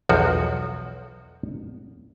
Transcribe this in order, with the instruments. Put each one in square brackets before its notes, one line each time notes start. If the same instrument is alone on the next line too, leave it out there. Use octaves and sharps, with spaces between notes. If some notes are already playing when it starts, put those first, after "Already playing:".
[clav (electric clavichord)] B1 E2 F3 F#4